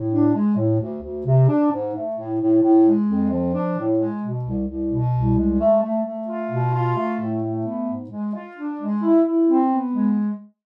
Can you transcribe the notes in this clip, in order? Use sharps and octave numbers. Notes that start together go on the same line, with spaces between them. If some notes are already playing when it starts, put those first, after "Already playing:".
Already playing: A2
D4
G#3
A2
D2
D2
C3
D4
G#2
A3
A2
A2
A2
G#3
F2
F3
D4
A2
G#3
B2
C2
C2
B2
C2
G#3
A3
A3
A3
F4
B2
F4
A3
A2
A3
B3
G#2
G#3
F4
D4
G#3
E4
E4
C4
B3
G#3